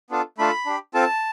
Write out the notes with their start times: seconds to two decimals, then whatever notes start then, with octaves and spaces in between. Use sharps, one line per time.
0.10 B3 D4 F4 A4
0.38 A3 D4 F4 A4 B5
0.66 D4 G4
0.94 C4 F4 A4 A5